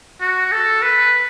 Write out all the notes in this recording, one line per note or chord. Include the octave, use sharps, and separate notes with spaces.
F#4
A4
B4